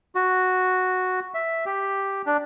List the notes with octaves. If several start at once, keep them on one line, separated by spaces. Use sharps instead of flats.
F#4
E5
G4
D4